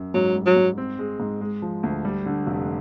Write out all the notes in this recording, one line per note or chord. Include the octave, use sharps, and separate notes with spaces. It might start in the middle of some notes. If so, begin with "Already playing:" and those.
Already playing: F#2
G#2 F#3
G3
F#3
G#2
C4
G#3
G#2
G#3
F3
D2
G3
D3
F1